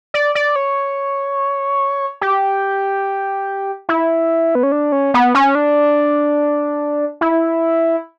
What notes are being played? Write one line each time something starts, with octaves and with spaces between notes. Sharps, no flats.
D5
D5
C#5
G4
E4
B3
C#4
D4
C#4
B3
C#4
D4
E4